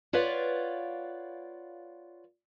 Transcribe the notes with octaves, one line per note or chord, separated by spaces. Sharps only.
F4 B4 C#5 D5 F5 F#5